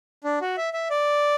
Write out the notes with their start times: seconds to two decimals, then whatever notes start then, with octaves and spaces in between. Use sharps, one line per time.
0.24 D4
0.41 F#4
0.57 E5
0.74 E5
0.90 D5